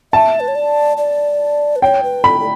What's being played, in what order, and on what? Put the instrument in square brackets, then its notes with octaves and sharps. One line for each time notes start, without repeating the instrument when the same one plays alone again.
[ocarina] E5 [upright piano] A5
[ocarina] B4
C#5
D5
D5
B4
[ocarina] C#5 [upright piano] G5
[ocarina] B4
[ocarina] A4 [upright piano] B5
[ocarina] A4